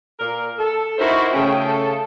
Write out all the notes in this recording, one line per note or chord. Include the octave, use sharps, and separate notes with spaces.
A#2 A#4
A4
D#4 E4 F#4 A#4 C5
C#3 A3 C#4 G5
A4